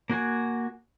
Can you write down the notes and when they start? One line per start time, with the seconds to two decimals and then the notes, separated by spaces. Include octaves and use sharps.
0.10 A#3 F#4 G#5